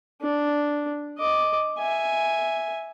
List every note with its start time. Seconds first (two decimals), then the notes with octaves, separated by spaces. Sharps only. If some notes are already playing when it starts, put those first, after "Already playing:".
0.21 D4
1.18 D#5 D6
1.78 E5 G#5